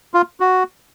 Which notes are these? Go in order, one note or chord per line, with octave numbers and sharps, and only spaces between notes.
F4
F#4